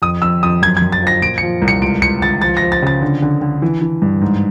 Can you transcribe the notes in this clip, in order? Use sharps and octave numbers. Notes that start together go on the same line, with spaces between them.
F2 D#6
F2 E6
F2 D#6
F#2 G#6
G#6
F#2
A6
F3 A#6
A#2 D7
C#7
F3
C2
C#7
C#2 D7
C#2 C#7
C#2 A6
F3 A6
A#6
F3
A6
C#3 A6
D3
D3
D3
E3
E3
G2
G#2